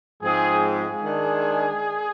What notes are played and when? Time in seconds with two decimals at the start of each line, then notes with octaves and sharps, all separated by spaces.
0.22 G#2 F3 G#3 C4 G#4
0.62 G#4
1.02 D#3 G#3 D4